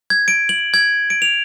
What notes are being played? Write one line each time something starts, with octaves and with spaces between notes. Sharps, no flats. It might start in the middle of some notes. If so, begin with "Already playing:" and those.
G#6
D7
F#7
G#6
D7
F7